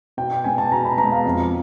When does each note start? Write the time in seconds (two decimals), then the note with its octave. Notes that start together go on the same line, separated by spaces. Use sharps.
0.17 B2 G5
0.31 G5
0.44 G#3 B3 G#5
0.58 A5
0.71 B2 A#5
0.85 B5
0.98 G#3 B3 A#5
1.12 F5
1.25 F2